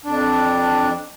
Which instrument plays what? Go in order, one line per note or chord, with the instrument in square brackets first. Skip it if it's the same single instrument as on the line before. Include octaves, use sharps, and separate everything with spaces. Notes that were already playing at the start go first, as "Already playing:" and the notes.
[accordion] F2 D4